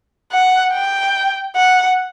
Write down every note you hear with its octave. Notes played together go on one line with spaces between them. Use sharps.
F#5
G5
F#5